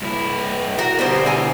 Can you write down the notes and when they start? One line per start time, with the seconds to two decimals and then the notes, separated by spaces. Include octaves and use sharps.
0.02 G2 E4
0.79 F#4 A#4
0.99 B2 D3 G3 C5 G#5
1.26 E4 G#5 A#5